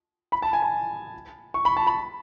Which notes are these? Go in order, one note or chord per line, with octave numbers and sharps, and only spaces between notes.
B5
A5
G#5
A5
C#6
B5
A5
B5